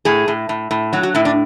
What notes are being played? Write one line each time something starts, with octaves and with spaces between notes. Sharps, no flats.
A2 G#4
A2
A2
A2
F#3 F#4
F#4
A2 E4
D4